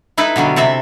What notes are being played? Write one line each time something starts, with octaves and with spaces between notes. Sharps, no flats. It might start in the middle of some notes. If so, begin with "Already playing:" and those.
D#4 E4 A4 B4
B2 D3 F#3 G3
C3 A4 E5